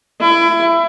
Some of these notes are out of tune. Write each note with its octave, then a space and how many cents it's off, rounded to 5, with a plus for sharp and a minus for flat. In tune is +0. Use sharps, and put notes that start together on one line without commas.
E4 +25